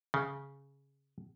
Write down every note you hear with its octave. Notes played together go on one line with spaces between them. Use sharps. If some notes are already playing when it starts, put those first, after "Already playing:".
C#3